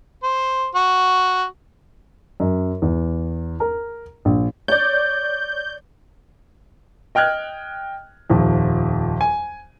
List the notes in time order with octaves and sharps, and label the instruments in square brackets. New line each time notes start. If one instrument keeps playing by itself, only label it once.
[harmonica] C5
F#4
[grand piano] F#2
E2
A#4
A#1
[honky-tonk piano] C#5 D5 [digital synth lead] G6
[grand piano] D#5 G5 F6 F#6 G#6
D#1 F2
G#5